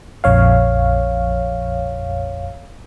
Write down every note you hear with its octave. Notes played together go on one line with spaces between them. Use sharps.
A#1 F2 C#5 F5